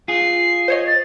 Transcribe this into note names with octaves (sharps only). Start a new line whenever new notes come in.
F4 G#4 C7
C5 C#5 D#5
A6